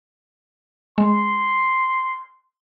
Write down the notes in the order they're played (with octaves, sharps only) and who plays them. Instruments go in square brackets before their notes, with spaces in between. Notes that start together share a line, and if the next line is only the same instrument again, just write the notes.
[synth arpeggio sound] G#3 [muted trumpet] C6